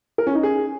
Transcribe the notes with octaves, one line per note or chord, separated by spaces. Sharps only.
A#4
C#4
D#4
G#4